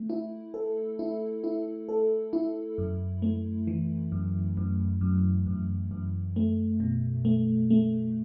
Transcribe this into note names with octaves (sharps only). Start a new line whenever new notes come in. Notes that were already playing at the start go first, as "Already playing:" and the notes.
Already playing: A3
E4
A4
E4
E4
A4
E4
F#2
A3
E3
F#2
F#2
F#2
F#2
F#2
A3
B2
A3
A3